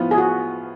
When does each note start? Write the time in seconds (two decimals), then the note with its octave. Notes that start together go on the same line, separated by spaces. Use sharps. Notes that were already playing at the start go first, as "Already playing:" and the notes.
Already playing: A2 F3 B3 F4
0.11 G#4
0.18 F#4